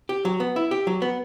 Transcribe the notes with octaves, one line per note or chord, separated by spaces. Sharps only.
G4
F#3
B3
E4
G4
F#3
B3